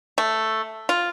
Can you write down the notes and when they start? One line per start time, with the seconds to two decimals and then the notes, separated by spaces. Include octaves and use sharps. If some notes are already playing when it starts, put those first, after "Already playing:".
0.18 A3
0.89 F4